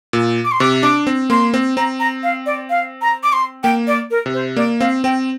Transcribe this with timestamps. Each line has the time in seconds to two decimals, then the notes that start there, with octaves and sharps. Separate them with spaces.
0.13 A#2
0.45 D6
0.52 C6
0.60 C3 D6
0.83 D4 D6
1.07 C4
1.30 A#3 C6
1.54 C4
1.77 C4 A#5
2.00 A#5
2.23 F5
2.46 D5
2.70 F5
3.02 A#5
3.23 D6
3.33 C6
3.64 A#3 G5
3.88 D5
4.11 A#4
4.26 C3
4.34 C5
4.56 A#3 D5
4.80 C4 F5
5.04 C4 G5